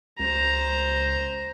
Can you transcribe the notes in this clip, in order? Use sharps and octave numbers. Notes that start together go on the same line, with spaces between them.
C#2 C5 A#5